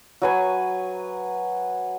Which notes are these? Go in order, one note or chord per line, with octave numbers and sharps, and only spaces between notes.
F#3 B4 G#5 C#6